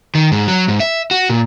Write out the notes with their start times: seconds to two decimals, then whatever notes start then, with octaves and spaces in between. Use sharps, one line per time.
0.15 D#3
0.32 G#2
0.48 F#3
0.68 G#2
0.80 E5
1.11 F#4
1.29 A#2